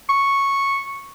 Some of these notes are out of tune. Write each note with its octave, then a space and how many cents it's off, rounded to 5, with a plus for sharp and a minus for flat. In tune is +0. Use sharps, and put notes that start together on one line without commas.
C#6 -5